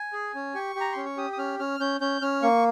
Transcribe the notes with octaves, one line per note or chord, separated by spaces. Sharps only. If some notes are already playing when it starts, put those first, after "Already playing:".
Already playing: G#5
G#4
C#4
G4 C#6
G4 A#5
C#4 C6
C#6
G4 D#6
D#6
C#4 F6
C#4 F6
C#4 G6
C#4 G6
C#4 F6
A#3 C#6